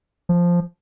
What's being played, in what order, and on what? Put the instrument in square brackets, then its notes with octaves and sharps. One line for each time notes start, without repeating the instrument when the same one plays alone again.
[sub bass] F3